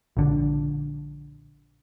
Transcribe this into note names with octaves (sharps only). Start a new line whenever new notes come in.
A#1 D3